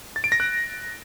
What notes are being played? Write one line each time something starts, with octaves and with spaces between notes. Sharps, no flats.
A6
D7
A#6
F#6